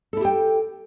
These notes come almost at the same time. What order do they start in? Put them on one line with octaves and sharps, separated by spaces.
A4 E4 G4 G5